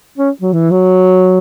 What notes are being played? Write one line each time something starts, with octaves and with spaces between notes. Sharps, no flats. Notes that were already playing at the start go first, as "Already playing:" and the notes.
C#4
F#3
E3
F#3